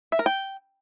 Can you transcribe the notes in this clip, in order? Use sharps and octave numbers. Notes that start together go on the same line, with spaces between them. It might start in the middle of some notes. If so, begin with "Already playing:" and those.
E5
A#4
G5